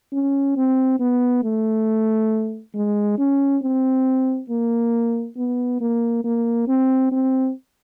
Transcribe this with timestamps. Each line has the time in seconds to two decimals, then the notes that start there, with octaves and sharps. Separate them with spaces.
0.13 C#4
0.57 C4
1.00 B3
1.44 A3
2.75 G#3
3.18 C#4
3.63 C4
4.50 A#3
5.37 B3
5.81 A#3
6.25 A#3
6.68 C4
7.12 C4